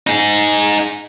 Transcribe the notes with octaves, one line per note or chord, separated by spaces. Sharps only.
D#4 G#4